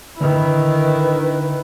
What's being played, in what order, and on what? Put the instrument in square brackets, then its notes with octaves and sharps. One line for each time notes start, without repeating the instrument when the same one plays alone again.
[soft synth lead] D3 [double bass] D#3 [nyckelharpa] E4 [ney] B4